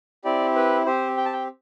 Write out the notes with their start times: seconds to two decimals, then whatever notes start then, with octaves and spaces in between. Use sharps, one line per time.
0.25 C4 E4 G4 D5
0.56 B4
0.86 C4 G4 C5
1.17 G5
1.25 A5
1.33 G5